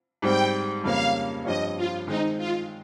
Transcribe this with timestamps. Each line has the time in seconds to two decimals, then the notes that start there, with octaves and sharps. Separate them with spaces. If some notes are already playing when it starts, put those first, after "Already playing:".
0.22 G#2 G3 C4 G5
0.84 F2 C#3 G3 A#3 C#4 F5
1.45 G2 F3 C4 G4 C#5 D#5
1.76 F4
2.06 D#3 G#3 C4 D#4
2.37 F4